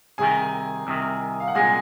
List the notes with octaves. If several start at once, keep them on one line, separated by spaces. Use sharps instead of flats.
C2 C3 D#3 G#4 G#5
C2 C3 D#3
F5
F#5
C2 A#2 G#3 G#4 G#5